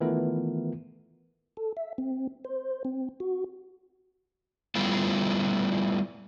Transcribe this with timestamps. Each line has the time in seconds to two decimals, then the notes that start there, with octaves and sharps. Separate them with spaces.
0.01 D#3 E3 A3 B3 F4 A#4
1.57 A4
1.77 E5
1.98 C4
2.45 C5
2.85 C4
3.20 F#4
4.75 F3 G3 A3 B3 E4 F4